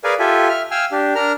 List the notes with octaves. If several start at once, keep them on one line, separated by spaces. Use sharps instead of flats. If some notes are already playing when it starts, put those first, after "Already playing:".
G#4 A#4 B4 D5 F5 G#5
F4 G4 A4 E5 G#5
E5 F6
F5 G5 G#5 E6 F6
D4 G4
D4 A#4 A#5 F6